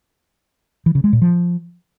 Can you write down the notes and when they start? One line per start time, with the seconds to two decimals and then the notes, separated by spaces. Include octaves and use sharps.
0.86 E3
0.95 C#3
1.04 G#3
1.13 A#2
1.22 F3